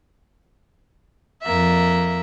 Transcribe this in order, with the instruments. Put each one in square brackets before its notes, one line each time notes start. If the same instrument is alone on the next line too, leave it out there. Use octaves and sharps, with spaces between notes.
[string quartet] F2 A#3 E5